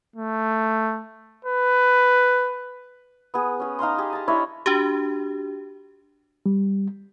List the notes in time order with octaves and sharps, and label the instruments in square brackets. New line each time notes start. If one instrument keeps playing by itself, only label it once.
[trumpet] A3
B4
[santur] B3 G#4
C#4 G#4
D#4 F5 A#5 C6
G4 G#4
A5 A#5
D4 E4 C#5 D#5
[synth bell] D4 F#4 G4
[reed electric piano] G3